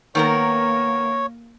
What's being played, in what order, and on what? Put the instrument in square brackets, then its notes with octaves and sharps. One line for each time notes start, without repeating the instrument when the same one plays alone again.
[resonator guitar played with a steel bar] D#3 B3 A#4 [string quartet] A#3 [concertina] C#5